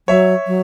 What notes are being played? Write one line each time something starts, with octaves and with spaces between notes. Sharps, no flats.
F#3 C#5 E5
F#3